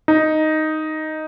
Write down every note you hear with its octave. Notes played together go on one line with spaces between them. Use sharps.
D#4